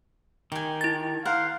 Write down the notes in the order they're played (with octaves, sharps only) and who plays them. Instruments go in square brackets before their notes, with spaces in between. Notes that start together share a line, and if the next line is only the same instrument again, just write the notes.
[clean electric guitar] D#3 [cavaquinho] G4 G#5
[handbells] E4 A6
[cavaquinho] A#4 C5 F#5 [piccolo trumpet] F5